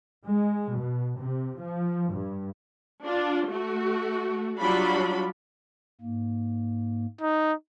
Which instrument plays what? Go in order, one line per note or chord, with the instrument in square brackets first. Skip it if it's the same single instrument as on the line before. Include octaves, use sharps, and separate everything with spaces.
[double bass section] G#3
B2
C3
F3
G2
[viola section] D4 F4
A3 F#4
F#3 G3 D4 F4 F#4 B5
[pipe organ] G#2 A#3
[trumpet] D#4